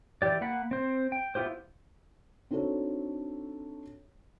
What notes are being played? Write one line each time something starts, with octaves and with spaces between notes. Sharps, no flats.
E3 G4 D5
A#3 F#5 B5
C4 C5
G5
B3 E4 F4 G4 C5
C4 D4 D#4 F#4 A4 C#5